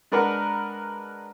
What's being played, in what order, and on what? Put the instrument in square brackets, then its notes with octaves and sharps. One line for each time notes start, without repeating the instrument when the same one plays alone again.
[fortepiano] G#3 D4 A#4 B4 F#5